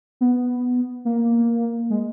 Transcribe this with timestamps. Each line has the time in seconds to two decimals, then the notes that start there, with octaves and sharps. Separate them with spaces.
0.21 B3
1.05 A#3
1.90 G#3